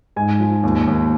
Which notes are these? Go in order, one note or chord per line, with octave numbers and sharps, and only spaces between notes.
G#2 G#5
F3
D#2
D#2